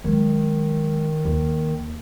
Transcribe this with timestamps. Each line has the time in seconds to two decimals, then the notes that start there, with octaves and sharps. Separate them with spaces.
0.04 D#3 F#3 G#3
1.25 D#2